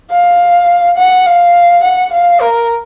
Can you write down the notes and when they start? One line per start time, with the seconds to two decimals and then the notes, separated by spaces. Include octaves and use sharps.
0.11 F5
0.98 F#5
1.26 F5
1.83 F#5
2.13 F5
2.41 A#4